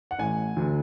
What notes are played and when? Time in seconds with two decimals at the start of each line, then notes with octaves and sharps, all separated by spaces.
0.11 F#5
0.19 A1 A2 G#5
0.56 D2 D3